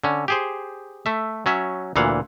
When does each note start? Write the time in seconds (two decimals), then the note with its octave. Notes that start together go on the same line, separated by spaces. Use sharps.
0.04 D3 C#4
0.28 G4 G#4 C5
1.06 A3 E5
1.46 F#3 C#4 E5
1.96 D2 A#2 E3 F5 F#5